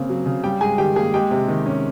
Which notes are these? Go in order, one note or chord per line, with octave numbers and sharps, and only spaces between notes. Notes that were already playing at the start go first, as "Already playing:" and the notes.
Already playing: C#3 A#3 C4
F#3
C#3
G3 G4 G5
G#2 G#4 G#5
D#3 G4 G5
A#3 G#4 G#5
G#3 G4 G5
C3
D#3
C#4